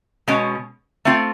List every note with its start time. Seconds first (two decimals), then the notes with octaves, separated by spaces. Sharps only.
0.28 B2 G#3 C#4
1.05 A3 C4 F4